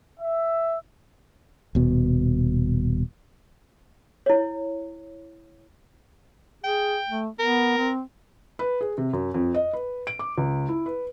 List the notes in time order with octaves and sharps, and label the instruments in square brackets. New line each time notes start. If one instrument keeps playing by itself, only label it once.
[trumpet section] E5
[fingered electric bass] D#1 B2
[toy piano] E4 C#5
[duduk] G#4 [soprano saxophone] G5
[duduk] A3
[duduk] B3 [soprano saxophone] A#4
[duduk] C4
[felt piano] B4
G#4
C3
F#2
F2
D#5
B4
D7
D6
C#2
E4
B4